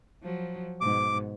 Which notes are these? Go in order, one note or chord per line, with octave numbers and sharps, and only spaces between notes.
F3 F#3
G#2 B2 D6